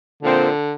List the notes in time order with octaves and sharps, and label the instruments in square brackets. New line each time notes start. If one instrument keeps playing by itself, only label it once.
[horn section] A#2 F3 C4 [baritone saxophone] D3